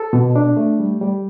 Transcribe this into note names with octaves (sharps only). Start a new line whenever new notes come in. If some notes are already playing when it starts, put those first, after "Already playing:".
Already playing: A4
B2
D4
A3
G3
G3